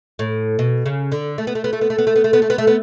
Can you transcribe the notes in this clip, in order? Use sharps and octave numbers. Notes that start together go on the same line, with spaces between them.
A2
B2
C#3
D3
A3
B3
A3
B3
A3
B3
A3
B3
A3
B3
A3
B3
A3
B3
A3
B3